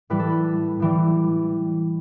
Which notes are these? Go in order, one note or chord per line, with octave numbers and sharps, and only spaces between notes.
A2 E3 G3 B4
A4
B4
A2 E3 G3